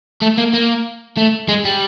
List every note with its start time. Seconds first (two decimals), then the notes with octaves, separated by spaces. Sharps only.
0.21 A3
0.37 A#3
0.53 A#3
1.17 A3
1.48 G#3
1.65 G3